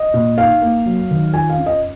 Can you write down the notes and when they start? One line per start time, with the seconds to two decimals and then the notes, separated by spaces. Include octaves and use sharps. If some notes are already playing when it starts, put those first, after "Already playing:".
Already playing: D#5
0.14 A#2
0.38 D#4 F5
0.62 A#3
0.86 F#3
1.11 D#3
1.34 F4 G#5
1.50 F5
1.58 C#4
1.66 D#5